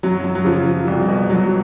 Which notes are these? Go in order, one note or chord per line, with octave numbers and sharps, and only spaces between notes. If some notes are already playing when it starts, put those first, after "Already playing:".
F#2 F#3
F#2
F#3
C#3 F3
F3
C2
B2
B2 F#3
F#3